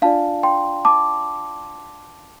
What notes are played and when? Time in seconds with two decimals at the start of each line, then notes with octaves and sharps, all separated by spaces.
0.02 D4 F4 D5 F5 A5
0.43 G5 C6
0.85 A5 D6